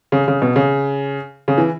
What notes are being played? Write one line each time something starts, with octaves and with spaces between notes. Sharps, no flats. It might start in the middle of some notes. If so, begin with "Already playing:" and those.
C#3
C#3
B2
C#3
C#3
E3